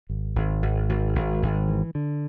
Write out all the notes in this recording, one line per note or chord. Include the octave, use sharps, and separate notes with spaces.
G#1
G#1
G#1
G#1
G#1
G#1
E3
D3